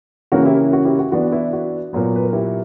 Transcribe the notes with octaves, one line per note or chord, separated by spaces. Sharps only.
C#3 E3 A#3 C#4 F#4 A#4
E4 G4
F#4
E4 G4
F#4
E3 B3 D4 F#4
E4
F#4
A#2 F#3 B3
B4
A#4
E4 G4